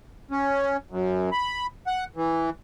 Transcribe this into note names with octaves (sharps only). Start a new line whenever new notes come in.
C#4
F#2
B5
F#5
E3